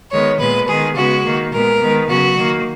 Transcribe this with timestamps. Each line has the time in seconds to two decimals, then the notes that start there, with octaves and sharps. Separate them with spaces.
0.11 D#3 G#3 B3 C#5
0.39 A#2 G#3 B3 B4
0.67 D#3 G#3 B3 G#4
0.95 C#3 G#3 B3 F#4
1.24 D#3 A#3
1.52 A#2 G#3 B3 A#4
1.80 D#3 G#3 B3
2.08 C#3 F#3 B3 F#4
2.36 D#3 A#3